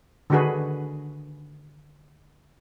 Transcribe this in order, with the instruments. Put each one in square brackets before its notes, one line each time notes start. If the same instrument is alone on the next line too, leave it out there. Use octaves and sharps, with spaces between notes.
[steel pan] D3 D#3 D4 F#4 G#4 B4